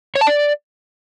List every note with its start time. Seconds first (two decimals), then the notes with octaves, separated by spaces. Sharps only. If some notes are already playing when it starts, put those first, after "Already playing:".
0.16 C#5
0.21 A5
0.27 D5